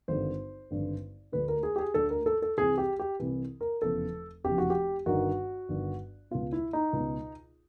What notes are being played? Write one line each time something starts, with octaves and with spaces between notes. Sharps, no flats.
G#1 G2 D3 C5
G#1 G2 D3
D2 D3 B4
A#4
G#4
G4
G#4
D2 D3 A4
A#4
A4
A4
C2 C3 E3 G#4
G4
G4
C2 C3 E3
A#4
F1 E2 C#3 A4
F1 E2 C#3 G4
F#4
G4
G1 G2 D#3 F#4
G1 G2 D#3
C#2 B2 F4
E4
D#4
C#2 B2